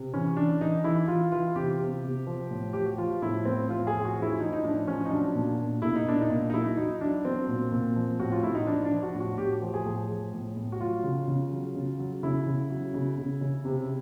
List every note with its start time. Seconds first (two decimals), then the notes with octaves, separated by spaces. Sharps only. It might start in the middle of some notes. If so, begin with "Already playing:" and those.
Already playing: C3
0.14 E3 C#4
0.37 E3 D4
0.61 E3 D#4
0.84 E3 E4
1.08 E3 F4
1.32 E3 F4
1.55 C3 G4
1.79 C3
2.04 C3
2.27 F3
2.51 A2
2.73 F3 G4
2.85 F#4
2.98 F3 F4
3.22 A2 E4
3.45 A2 C4
3.69 F3 F4
3.87 G#4
3.93 A2
4.05 F#4
4.16 F3
4.22 E4
4.40 F3 D#4
4.53 D#4
4.64 A2 D4
4.87 F3 C#4
5.05 D#4
5.11 F#3 D4
5.35 A#2
5.59 A#2
5.82 A#2 E4
5.96 D#4
6.06 A#2 D4
6.21 D#4
6.30 A#2
6.50 D#4
6.54 F#3 E4
6.77 F#3 D#4
7.01 F#3 D4
7.24 F#3 C4
7.48 A#2
7.72 A#2
7.96 F3
8.20 A2 F#4
8.32 F4
8.43 A2 E4
8.55 D#4
8.67 F3 D4
8.85 D4
8.91 F3
9.03 F#4
9.14 A2
9.20 F#4
9.38 A2 G4
9.62 F3
9.74 G#4
9.85 A2
10.09 F3
10.33 A2
10.57 A2
10.72 F#4
10.80 F#3 F4
11.04 C#3
11.28 C#3
11.52 F#3
11.75 C#3
11.99 F#3
12.23 C#3 E4
12.46 C#3
12.70 F#3
12.94 C#3
13.18 C#3
13.41 C#3
13.65 C3